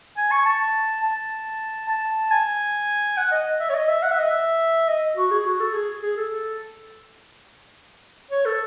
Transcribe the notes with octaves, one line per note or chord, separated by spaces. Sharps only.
G#5
C#6
A5
A5
A5
G#5
F#5
D#5
E5
C#5
D#5
E5
F#5
E5
D#5
E5
D#5
F#4
G#4
F#4
A4
G#4
G#4
A4
C#5
A4